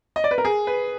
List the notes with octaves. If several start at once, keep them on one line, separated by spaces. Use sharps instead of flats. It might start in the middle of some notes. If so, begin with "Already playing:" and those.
D#5
D5
B4
A#4
G#4
B4